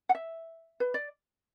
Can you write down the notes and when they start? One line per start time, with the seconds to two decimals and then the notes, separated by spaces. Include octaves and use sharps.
0.09 F#5
0.15 E5
0.80 B4
0.94 D5